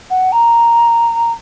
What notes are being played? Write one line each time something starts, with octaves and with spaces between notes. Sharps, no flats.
F#5
A#5